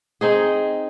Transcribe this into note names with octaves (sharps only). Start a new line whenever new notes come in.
C4 D#4 G#4